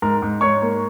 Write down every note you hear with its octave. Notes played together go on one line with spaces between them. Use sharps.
G#2 A#4 A#5
G#2
G#2 C#5 C#6
A#3